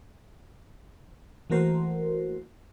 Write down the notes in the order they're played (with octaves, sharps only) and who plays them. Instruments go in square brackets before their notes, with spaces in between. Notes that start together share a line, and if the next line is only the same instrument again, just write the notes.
[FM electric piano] E3 A3 A#3 F#4 A#4 C5